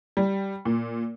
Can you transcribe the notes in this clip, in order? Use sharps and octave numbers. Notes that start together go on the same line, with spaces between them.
G3
A#2